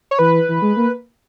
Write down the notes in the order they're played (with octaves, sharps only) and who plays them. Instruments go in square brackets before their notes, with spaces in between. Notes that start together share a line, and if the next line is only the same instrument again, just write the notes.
[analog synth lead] C#5
[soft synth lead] E3 [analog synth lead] B4
[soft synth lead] E3
G#3
A#3